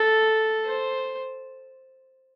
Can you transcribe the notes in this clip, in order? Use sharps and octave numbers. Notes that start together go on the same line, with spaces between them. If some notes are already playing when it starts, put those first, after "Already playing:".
Already playing: A4
C5